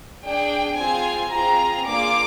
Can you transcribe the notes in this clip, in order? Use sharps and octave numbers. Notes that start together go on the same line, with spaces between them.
D4 G#4 G5
C4 F4 G#4 G#5
C4 F4 G#4 A#5
A#3 D4 F4 G#4 D6